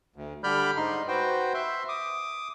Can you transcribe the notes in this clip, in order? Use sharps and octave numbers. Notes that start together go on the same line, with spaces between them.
D2
D3 G3 D5 B5 F6 G6
G#2 D#4 C6
F#4 B4 C5 G5
E5 C6
D6 D#6